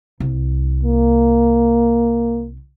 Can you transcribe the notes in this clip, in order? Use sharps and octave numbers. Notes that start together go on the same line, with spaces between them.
C2
A#3